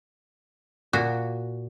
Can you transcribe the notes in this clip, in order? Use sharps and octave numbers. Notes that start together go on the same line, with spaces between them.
A#2 F#4